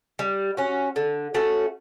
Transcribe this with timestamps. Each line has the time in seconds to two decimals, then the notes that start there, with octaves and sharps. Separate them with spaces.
0.19 G3
0.57 C#4 F#4
0.96 D3
1.34 A3 C#4 F#4